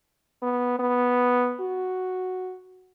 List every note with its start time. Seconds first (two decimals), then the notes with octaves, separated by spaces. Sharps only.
0.42 B3
0.79 B3
1.60 F#4